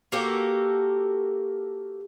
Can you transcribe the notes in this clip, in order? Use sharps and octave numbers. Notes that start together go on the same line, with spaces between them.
A#3 F#4 G4 A4